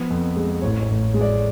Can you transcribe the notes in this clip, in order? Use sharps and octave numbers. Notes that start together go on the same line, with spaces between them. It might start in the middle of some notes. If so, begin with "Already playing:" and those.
Already playing: F3 B3
F2
G#3
A1 C#5
C#5
A1
G#3
D5